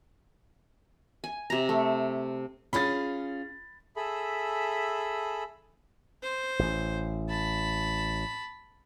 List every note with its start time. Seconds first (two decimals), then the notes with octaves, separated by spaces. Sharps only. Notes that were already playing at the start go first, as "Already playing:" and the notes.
1.24 G#5
1.50 C3 A#5
1.69 A3
2.73 C#4 F4 G#4 B5 A6
3.96 G#4 A4 E5 B5
6.22 C5
6.59 A1
7.29 A5 B5